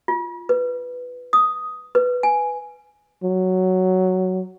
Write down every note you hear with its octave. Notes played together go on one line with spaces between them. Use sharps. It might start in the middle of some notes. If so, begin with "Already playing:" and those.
F4
B4
D#6
B4
G#5
F#3